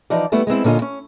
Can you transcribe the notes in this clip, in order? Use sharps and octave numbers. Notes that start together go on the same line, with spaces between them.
E3 F3 D#4 D5
G3 A3 B3 E4
G#3 B3 C4 E4
A#2 D3 C#4 F4 D#5
C#4